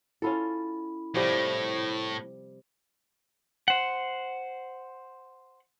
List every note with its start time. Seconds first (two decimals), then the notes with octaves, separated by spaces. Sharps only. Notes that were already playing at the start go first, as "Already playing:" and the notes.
0.22 C#4 E4 F4 A4 B5
1.15 A2 C3 F3 G3
3.68 C5 F#5